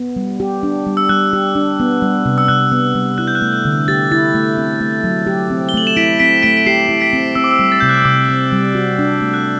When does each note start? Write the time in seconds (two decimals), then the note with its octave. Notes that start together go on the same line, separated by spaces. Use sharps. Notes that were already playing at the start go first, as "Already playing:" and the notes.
Already playing: B3
0.16 G3
0.40 G4
0.63 D4
0.86 G3
0.97 E6
1.09 G3 F#6
1.33 G4
1.56 D4
1.80 B3
2.02 G3
2.26 C3
2.38 E6
2.48 C3 F#6
2.72 B3
2.95 G3
3.18 E4 F#6
3.28 G6
3.35 F#6
3.42 A3
3.53 F#6
3.65 D3
3.88 G4 A6
4.11 E4 A6
4.35 A3
4.58 C4
4.81 A3
5.04 F#3
5.27 G4
5.50 C4
5.69 G7
5.74 A3 F#7
5.87 E7
5.96 E4 B6 D7
6.19 C4 B6 D7
6.43 A3 B6 D7
6.57 D7
6.66 G4 C7 E7
6.89 E4
7.01 B6 D7
7.13 C4
7.35 C4 E6
7.44 D6
7.51 E6
7.59 G3
7.72 A6
7.80 C3 G6
7.89 F#6
7.98 E6
8.05 C3 D6
8.29 C4
8.52 G3
8.75 F#4
8.99 D4
9.21 A3
9.34 F#6